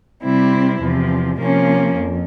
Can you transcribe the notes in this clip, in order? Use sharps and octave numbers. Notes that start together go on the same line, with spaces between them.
C3 G3 C4 E4
E2 C3 F3
C3 F3 A#3 C#4
F2